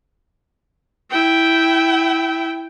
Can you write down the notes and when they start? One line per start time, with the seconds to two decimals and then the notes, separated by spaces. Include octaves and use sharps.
1.11 E4 G5